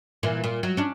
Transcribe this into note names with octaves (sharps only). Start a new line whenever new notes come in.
A#2 E3
A#2
F#3
C#4 D4